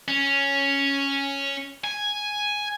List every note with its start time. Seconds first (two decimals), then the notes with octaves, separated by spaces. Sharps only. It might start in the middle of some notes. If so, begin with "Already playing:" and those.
0.08 C#4
1.84 G#5